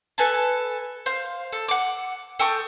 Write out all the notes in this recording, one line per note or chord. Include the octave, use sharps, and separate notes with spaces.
A4 B4 G#5 A5
C5 F5
A4
F#5 D6
A4 G5 C#6 D#6